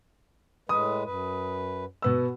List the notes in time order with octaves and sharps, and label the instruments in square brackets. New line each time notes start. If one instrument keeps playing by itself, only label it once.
[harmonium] A2 G#3 B4 [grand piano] D#6
[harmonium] F#2 B4
[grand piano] B2 B3 E6